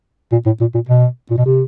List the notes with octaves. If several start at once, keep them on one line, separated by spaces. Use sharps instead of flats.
A#2
A2
A#2
A#2
B2
A#2
B2
C3